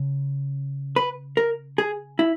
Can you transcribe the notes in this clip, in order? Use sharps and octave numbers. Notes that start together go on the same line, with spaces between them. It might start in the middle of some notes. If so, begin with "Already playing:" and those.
Already playing: C#3
B4
A#4
G#4
E4